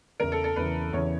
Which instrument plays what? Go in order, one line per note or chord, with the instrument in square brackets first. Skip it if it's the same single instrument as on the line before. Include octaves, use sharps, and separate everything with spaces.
[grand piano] E2 C#3 E3 [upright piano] A#4
[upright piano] A4
A4
[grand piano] E2 C#3 E3 [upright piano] B4
[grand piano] E2 C#3 E3 [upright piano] C#5